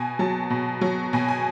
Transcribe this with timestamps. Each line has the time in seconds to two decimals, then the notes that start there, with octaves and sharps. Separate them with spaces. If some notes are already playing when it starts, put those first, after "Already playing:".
Already playing: B2 G#5
0.19 F#3 A5
0.50 B2
0.81 F#3
1.13 B2 G#5
1.28 G#5